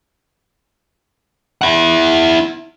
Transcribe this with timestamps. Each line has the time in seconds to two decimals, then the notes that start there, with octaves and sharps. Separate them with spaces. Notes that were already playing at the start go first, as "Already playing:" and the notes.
1.61 E4 F#5